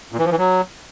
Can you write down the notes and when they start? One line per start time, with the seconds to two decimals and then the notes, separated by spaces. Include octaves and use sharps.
0.12 A#2
0.19 E3
0.25 F3
0.32 E3
0.38 F#3